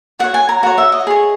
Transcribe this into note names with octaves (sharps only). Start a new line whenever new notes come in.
F#4 C#5 F#5
G#5
A#5
F#4 C#5 F#5
E5
D#5
G#4 C#5